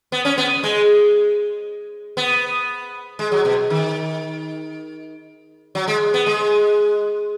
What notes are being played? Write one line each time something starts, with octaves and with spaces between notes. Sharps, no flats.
B3
C#4
B3
G#3
B3
G#3
F#3
B2
D#3
F#3
G#3
B3
G#3